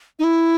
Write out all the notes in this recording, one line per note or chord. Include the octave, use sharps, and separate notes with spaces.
D#4
E4